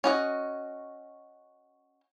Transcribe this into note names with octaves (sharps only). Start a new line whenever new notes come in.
C#4 F#4 D#5